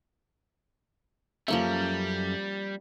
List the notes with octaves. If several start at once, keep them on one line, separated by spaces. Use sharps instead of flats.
F#2 F3 G3 A#3 C#4 A4 E5